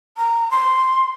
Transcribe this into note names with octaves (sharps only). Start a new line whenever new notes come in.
A#5
C6